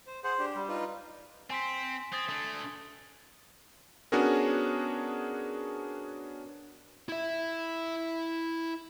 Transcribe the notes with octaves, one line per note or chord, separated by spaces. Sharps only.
C5
G#4 C5 F#5
D4 G4
G3
D#4 F4 B4
C4 G#5 C6 B6
C4 D#6 G#6 A6
A3 D4
B3 C#4 D4 F#4 G#4 A#4
E4 E5